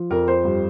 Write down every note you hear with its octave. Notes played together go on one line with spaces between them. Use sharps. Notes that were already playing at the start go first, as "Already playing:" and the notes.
Already playing: F3
F2 A#4
C5
G2